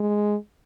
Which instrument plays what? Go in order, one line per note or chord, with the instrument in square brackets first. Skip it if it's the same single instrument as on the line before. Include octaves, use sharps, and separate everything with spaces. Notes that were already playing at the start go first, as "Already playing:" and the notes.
Already playing: [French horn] G#3